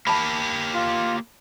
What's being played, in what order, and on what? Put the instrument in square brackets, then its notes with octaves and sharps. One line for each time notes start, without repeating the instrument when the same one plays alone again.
[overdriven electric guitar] A#3 G4 [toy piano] A5 B5
[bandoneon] F4